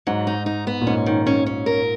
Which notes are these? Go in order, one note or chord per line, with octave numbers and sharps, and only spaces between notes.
G#2 F#3
D#4
D#4
B3
A#2
G#2 C#4
D#3
C#4
C#4
A#4